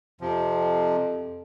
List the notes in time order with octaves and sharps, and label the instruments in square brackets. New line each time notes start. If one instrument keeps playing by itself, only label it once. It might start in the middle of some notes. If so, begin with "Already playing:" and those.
[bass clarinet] F2 [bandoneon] C3 F3